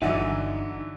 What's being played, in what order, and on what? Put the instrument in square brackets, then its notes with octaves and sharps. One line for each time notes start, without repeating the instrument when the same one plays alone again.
[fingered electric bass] G1 [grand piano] D3 E3 F#3 [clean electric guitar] D#4 F#5 [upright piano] E5